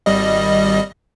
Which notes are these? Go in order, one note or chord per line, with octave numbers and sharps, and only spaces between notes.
G#1 G3 D#5